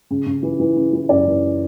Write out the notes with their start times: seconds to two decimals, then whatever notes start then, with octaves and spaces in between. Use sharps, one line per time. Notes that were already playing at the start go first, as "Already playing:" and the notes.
0.11 C#3
0.26 C#3
0.43 E3
0.60 E3
0.76 C#3
0.93 E3
1.09 F#2 D5
1.27 E3